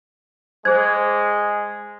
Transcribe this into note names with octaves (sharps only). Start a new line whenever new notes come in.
G#3 G#4 C5 G#6